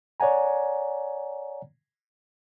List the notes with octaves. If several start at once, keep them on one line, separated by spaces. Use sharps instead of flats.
C#5 D5 F#5 G#5 A#5